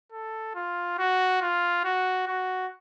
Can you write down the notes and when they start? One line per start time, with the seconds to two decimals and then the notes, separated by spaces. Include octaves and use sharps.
0.12 A4
0.55 F4
0.98 F#4
1.42 F4
1.84 F#4
2.28 F#4